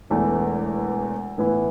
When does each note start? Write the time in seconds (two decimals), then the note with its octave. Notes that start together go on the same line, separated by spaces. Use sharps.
0.10 E1 E2 E3 A3
1.38 A2 E3 B3 E4